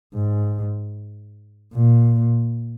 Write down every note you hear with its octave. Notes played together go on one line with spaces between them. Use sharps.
G#2
A#2